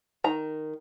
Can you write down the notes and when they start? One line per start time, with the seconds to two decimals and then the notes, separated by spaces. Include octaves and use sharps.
0.24 D#3 A#5